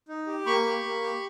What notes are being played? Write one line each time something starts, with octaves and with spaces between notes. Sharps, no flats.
D#4
G4
A#3 B5 C#6
G4
A#3
G4